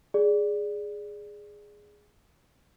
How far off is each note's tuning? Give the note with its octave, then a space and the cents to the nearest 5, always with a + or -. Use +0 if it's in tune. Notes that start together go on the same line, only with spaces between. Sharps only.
G#4 +0 D5 +0